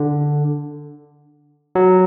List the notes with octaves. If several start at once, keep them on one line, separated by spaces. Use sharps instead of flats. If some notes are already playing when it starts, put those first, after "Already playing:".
Already playing: D3
F#3